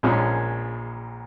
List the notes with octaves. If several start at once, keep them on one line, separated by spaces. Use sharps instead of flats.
A#1 A#2 F3 G#3 C#4